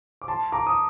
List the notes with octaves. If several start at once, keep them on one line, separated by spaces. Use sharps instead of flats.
D6
A5 C6
A#5 D6
D#6